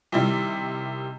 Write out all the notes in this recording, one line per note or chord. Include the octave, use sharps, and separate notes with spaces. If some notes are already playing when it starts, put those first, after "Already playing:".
C3 D#3 G3 E4